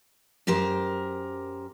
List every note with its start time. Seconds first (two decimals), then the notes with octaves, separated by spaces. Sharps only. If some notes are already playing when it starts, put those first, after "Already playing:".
0.47 F#2 G4 A#4 C5